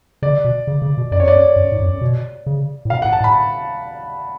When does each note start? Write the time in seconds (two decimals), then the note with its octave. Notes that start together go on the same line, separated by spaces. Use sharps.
0.22 C#3 D5
0.45 B2
0.67 C#3
0.82 C#3
0.98 B2
1.12 F#2 D5
1.20 F2 C#5
1.28 F#2 D5
1.56 F#2
1.72 G#2
1.82 F2
1.86 F#2
2.01 B2
2.47 C#3
2.85 A2
2.90 B2 F5
3.02 F#5
3.05 A2
3.13 A5
3.20 A2
3.24 B5